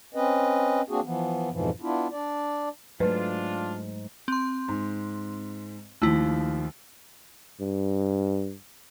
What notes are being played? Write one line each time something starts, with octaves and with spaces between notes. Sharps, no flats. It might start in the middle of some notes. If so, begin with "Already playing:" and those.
C4 C#4 B4 D#5
A#3 C4 D4 F#4 G#4
E3 F3 B3
F2 G#2 B2 E3 F3
B3 D4 E4 F4
D4 D5
G#2 F#3 A3 D4 F4 B4
C4 C6
G#2
D#2 D#3 F3 A3 E4
G2